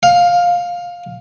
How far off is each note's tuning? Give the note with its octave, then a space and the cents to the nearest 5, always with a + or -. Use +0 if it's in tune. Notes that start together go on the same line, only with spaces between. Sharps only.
F5 +10